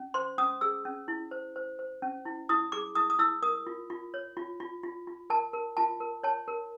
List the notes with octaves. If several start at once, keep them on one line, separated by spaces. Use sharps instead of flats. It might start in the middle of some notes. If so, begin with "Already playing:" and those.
Already playing: C#4
C5 C6
C#4 D#6
G#4 E6
C#4
E4
C5
C5
C5
C#4
E4
E4 D#6
G#4 D6
E4 D#6
D#6
E4 E6
A#4 D#6
F4
F4
C#5
F4
F4
F4
F4
A#4 A5
A#4
F4 A5
A#4
C#5 A5
A#4